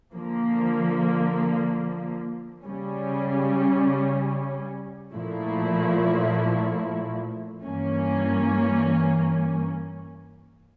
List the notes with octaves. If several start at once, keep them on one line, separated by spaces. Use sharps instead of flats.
D3 F3 A#3
C#3 G3 C#4
A#2 F3 A3 E4
G2 E3 A#3 C#4